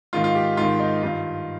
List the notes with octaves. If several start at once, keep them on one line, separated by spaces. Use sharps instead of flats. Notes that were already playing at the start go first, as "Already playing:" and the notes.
G#2 D#3 F4
F4
G4
G#2 F4
D#3
D#4
G2 D#3 F4